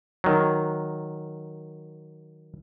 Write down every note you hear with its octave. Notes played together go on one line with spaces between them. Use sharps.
D#3 F#3